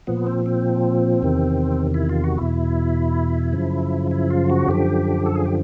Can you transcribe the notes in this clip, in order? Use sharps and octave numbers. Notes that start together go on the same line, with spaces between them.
A#2 F3 B3
C4
C4
E2 C3 D#3
E4
F4
F#4
E2 B2 E4
F#2 C#3 F3
E4
F4
F#4
F#2 D3 F3 G4
A4
G#4
G4